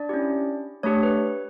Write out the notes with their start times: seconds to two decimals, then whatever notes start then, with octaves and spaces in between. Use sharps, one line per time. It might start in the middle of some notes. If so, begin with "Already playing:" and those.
Already playing: D4 D5
0.09 C#4 E4 G4
0.83 A3 D4 G4 C#5
1.03 B4